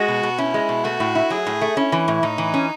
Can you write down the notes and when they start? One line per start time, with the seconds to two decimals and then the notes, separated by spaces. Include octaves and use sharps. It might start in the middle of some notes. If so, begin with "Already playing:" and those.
Already playing: G#3 F#4
0.08 B2
0.23 B2
0.38 C#4 E4
0.54 G#3
0.69 B2
0.84 A3 F#4
1.00 A2
1.15 E4
1.30 F#3 G#4
1.46 A2
1.61 A3
1.77 C#4 E4
1.92 E3
2.08 A2
2.23 A2 D#4
2.38 E3
2.54 C#4